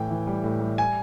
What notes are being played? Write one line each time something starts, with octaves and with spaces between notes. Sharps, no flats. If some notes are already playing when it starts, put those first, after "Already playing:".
Already playing: A2 E3 G5
E3
G3
A2
G3
G#5